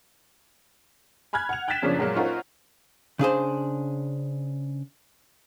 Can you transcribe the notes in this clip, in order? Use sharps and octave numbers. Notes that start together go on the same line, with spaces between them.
G#5 B5 F6 F#6 G#6
F#5 F7
G5 F#6 G#6 A6 B6 E7
F#2 C#3 F3 A#3 C#4 D4
A#2 F#3 G#3 A#3
C#4 D#4 F4 F#4 A#4 C5
C#3 D4 G#4 C5